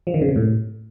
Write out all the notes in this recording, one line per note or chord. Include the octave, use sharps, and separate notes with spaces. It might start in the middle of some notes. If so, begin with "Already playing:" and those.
F3
D#3
C#3
C3
A2